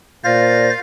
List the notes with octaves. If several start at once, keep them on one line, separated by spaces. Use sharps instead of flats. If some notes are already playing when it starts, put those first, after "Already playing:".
A#2 F4 C5 D5 F5 A#6